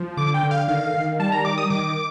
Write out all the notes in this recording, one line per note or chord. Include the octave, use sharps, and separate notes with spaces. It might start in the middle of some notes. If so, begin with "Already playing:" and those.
Already playing: F3
D3 D6
G5
D3
F5
D#3 F5
D#3
G3 A5
A#5
D#3 D6
D#6
D#3 D6